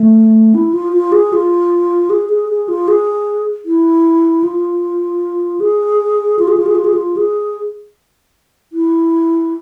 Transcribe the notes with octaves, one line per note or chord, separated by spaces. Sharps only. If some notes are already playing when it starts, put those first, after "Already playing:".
Already playing: A3
E4
F4
F4
G#4
F4
G#4
G#4
G#4
F4
G#4
E4
F4
G#4
F4
G#4
F4
G#4
F4
G#4
F4
G#4
E4